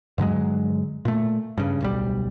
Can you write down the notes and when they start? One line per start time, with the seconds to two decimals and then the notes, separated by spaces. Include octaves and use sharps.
0.18 G2 D3 F#3 G#3
1.05 A#2 A3
1.58 G2 C#3
1.81 D1 B1 G3